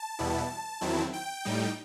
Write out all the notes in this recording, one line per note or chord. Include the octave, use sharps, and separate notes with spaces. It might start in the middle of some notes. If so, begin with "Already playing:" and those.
Already playing: A5
E2 B2 G3 B3 E4
E2 D#3 F#3 C4 E4
G5
A2 G3 D#4